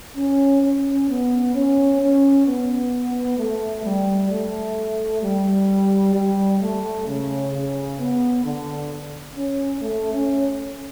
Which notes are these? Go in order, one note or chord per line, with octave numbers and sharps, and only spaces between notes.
C#4
C#4
B3
C#4
C#4
B3
A3
G3
A3
G3
G3
A3
C#3
C#3
B3
D3
C#4
A3
C#4